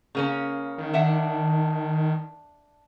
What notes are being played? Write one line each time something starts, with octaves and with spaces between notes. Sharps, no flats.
C#3 A#3 C#4
D#3
D4 E5 F#5